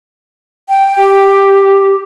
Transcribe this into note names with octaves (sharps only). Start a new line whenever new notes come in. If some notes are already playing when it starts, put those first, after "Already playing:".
G5
G4